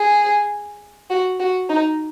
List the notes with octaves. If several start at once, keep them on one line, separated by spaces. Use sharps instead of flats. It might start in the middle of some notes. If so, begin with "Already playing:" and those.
Already playing: G#4
F#4
F#4
D#4